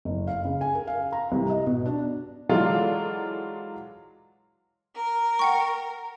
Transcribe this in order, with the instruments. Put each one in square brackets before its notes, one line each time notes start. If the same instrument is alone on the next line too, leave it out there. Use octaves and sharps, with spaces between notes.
[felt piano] F#1
F5
C#3
G#5
A#4
F5
A#5
C2
D#5
B2
D4
[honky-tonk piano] E3 F#3 G#3 F4 A4 D5
[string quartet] A#4
[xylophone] F#5 G5 C#6